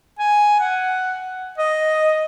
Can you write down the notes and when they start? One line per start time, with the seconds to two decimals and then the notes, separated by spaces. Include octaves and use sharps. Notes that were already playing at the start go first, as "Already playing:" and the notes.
0.19 G#5
0.60 F#5
1.58 D#5